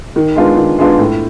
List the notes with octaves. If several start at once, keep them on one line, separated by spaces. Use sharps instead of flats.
D#3
G#3 B3 D4 F4
D#3
G#3 B3 D4 F4
A2